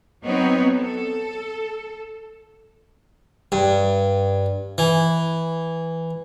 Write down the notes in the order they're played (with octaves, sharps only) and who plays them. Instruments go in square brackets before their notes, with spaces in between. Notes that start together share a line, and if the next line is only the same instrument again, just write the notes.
[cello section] F#3 B3 C4 D#4 C#5
A4
[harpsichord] G2
E3